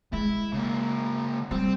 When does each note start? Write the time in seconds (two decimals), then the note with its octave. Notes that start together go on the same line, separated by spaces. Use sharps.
0.13 G#3 E4
0.53 C#3 A#3
1.51 G3 C4